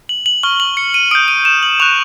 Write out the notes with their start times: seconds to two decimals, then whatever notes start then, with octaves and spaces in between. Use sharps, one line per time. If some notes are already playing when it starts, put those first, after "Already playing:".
0.09 F#7
0.26 F#7
0.43 C#6 F6 G7
0.60 F#7
0.77 C#7
0.94 D#7
1.11 D#6 G6 D7
1.28 D#7
1.45 E7
1.63 F#7
1.80 C#6 F#6 F7